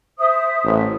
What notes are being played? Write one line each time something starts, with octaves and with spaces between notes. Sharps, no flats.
C5 E5 D#6
A1